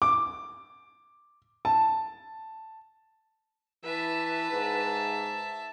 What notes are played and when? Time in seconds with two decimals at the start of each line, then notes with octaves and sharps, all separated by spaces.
0.02 D6
1.65 A5
3.85 E3 B4 E5 A5
4.52 G#2